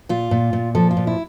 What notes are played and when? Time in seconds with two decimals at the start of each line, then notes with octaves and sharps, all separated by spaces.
0.09 A#2 F4
0.31 A#2
0.53 A#2
0.75 F3 A4
0.91 F4
0.97 A#2
1.07 E4